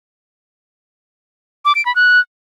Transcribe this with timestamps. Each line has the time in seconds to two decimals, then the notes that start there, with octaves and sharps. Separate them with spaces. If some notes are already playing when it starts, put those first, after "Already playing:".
1.65 D6
1.75 D7
1.85 B5
1.96 F#6